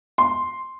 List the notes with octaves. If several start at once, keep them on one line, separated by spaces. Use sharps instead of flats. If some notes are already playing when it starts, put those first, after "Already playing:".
C6